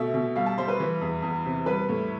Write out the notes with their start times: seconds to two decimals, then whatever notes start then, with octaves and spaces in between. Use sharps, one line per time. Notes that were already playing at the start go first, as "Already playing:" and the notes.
Already playing: B2 A3 E5
0.14 B2
0.36 G3 F5
0.46 A5
0.58 G3 C5
0.68 B4
0.80 E3
1.01 E2
1.23 E2
1.45 C3
1.66 G3 B4
1.89 A2